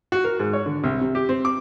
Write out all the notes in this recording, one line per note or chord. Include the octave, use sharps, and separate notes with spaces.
F#4
A#4
G#2
C#5
D3
C2
C3
G4
C4
D6